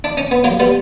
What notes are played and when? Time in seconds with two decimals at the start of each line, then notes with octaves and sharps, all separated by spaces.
0.04 D4
0.17 C#4
0.31 B3
0.44 F#3 A#3
0.60 G3 B3